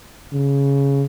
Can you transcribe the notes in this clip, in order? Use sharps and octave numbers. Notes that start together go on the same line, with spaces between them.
C#3